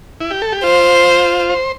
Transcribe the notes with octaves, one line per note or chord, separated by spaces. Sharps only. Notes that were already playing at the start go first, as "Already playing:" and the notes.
E4
G4
A4
G4
F4 C5
C5